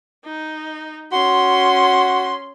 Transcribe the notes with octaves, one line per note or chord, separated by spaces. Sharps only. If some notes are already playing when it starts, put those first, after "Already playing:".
D#4
C#4 F#4 C6